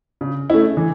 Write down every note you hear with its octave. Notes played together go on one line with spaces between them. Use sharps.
C#3
A3 C#4 E4
E3